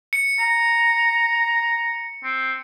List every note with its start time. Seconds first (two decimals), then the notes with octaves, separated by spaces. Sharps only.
0.13 C#7
0.39 A#5
2.23 C4